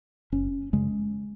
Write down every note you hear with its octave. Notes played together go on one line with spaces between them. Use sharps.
F#1 C#4
F#2 C#3 G#3